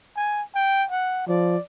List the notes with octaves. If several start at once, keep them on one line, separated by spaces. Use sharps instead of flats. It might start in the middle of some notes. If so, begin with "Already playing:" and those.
G#5
G5
F#5
F3 D5